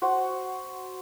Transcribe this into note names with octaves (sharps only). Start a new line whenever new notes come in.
F#4 C5 F#5